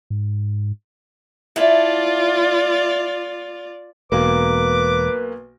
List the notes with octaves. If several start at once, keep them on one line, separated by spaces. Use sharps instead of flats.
G#2
E4 F4 D5 A5
E1 B1 A#3 B4 D6